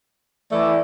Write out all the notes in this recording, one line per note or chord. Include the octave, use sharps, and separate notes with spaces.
E3 A3 E4 D5